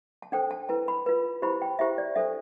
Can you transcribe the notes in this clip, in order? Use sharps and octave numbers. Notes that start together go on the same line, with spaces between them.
A5
D4 A4 C5 G5
A5
E4 B4 A5
B5
F4 B4
E4 G4 C5 B5
G5
E4 G4 C5 E5
D5
D4 A4 C5 E5